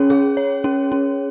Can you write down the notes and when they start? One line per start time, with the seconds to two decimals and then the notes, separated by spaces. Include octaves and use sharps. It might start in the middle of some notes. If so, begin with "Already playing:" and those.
Already playing: C#4 G#4 C#5
0.10 G#4
0.37 C#5
0.64 C#4
0.92 C#4